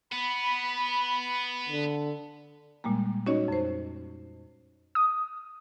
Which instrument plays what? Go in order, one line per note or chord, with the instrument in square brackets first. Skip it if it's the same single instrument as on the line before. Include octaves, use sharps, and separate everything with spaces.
[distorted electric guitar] B3 [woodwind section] B5
[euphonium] D3
[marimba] A#2 G3 G#3 A#3
C#4 D#4 F#4 C#5 D#5
F2 C5
[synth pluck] D#6